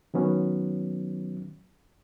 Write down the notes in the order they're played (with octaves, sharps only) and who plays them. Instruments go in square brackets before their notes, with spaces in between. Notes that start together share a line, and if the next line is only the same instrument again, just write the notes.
[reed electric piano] D#3 F#3 B3 C#4